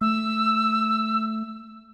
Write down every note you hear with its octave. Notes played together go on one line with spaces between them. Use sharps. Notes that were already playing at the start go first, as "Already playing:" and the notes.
A3 E6